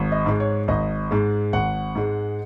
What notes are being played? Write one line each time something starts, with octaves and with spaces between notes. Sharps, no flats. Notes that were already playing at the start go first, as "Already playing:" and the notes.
Already playing: G#1
D#5
G#2 G#3
C#5
G#1 D#5
G#2 G#3
G#1 F#5
G#2 G#3